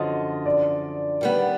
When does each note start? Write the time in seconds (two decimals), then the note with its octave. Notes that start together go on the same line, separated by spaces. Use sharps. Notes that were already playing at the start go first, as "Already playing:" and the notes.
Already playing: F#2 D3 F3 D#5
0.46 D5
1.21 D#3 G3 B3